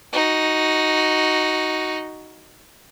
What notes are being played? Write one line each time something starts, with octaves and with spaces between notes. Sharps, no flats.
D#4 F#4